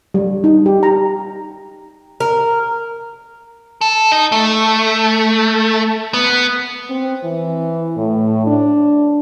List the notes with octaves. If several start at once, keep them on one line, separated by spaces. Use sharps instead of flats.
G3
D#4
G4
A#5
A#4
A4
D#4
A3
B3
C4
E3
A2
D4